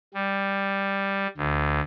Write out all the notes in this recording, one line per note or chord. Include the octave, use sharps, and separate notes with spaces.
G3
D2